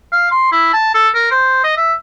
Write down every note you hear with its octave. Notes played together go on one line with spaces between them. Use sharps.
F5
C6
E4
A5
A4
A#4
C5
D#5
E5